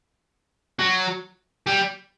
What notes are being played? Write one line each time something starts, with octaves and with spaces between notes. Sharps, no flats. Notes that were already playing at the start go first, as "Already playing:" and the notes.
F#3
G3